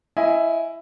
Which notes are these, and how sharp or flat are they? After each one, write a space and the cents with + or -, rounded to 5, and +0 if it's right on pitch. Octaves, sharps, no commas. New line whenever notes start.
E4 +15 D#5 +30 G#5 +0